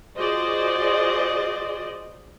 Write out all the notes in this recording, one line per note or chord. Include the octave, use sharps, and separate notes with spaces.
F4 F#4 G#4 C5 D5 D#5